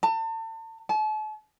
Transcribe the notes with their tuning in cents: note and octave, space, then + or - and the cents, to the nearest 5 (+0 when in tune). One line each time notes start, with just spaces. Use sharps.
A5 +35
A5 -40